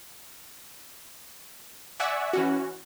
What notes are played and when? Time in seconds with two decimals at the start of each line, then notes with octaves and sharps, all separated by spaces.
2.00 D5 E5 F#5 G#5 C#6 E6
2.33 E3 C#4 F#4